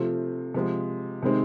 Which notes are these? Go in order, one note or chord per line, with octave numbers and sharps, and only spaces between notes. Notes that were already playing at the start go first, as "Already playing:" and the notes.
Already playing: C3 F3 A3 C4 F4
C3 F3 G#3
C3 D#3 G#3 C4